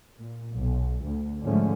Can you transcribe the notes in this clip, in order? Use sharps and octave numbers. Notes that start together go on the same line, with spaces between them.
A#2
B1
D2
G#2 D3 F3 G#3 A3 C#4